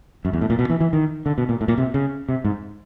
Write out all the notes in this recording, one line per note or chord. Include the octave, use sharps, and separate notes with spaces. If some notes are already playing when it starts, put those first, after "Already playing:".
F#2
E2
A2
A#2
B2
E3
E3
D#3
D3
B2
A#2
A2
A#2
C3
C#3
C3
G#2